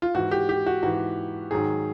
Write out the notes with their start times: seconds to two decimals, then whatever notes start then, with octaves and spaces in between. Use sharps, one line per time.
0.02 F4
0.14 G#2 E3 F#4
0.31 G4
0.49 G4
0.66 F#4
0.83 G#2 E3 F#4
1.51 G#2 D#3 F#3 G#4